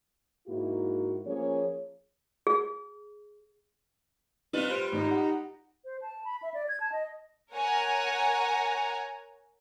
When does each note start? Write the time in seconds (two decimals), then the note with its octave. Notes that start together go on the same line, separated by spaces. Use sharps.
0.48 G#2 A#3 E4 F#4
1.26 F3 A#3 C#4 G#4 C#5
2.47 G#4
4.53 G3 C4 D#4 F4 B4
4.69 G4 C5 D7
4.92 G#1 D#4
5.07 G4 F#5
5.85 C5
6.02 A5
6.24 B5
6.43 E5
6.54 D5
6.69 G#6
6.80 A5
6.92 D#5
7.53 A#4 C#5 F#5 G#5 A#5